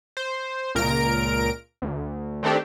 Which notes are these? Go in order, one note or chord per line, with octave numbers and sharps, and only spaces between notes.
C5
C#2 A#2 A#4 A#5 D7
D2
D#3 A3 C4 D4 G4